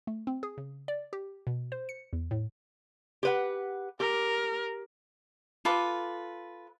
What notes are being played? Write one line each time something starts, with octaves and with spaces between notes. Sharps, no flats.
A3
C4
G#4
C#3
D5
G4
B2
C5
C#7
E2
A2
G4 B4 F#5
G4 A#4
F4 A4 B4 D6